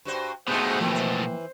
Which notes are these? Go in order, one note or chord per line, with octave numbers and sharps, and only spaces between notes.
G2 F#4 C5
G2 B2 A3 D#4 G#4 C5 F#5
E3 F3 A#3 C4 G5
C5